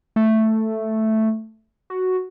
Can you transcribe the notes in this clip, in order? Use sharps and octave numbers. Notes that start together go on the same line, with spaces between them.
A3
F#4